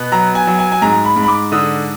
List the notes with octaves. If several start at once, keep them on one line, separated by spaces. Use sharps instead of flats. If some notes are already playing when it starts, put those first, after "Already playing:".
Already playing: B2 B3
F#3 A#5
G#5
F#3
G#5
G#5
G#2 A#5
B5
G#2
B5
D6
D3 D#6